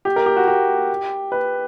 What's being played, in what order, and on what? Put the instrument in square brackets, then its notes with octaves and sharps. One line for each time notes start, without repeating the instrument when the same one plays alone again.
[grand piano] G4
A#4
G4
F#4
G4
B4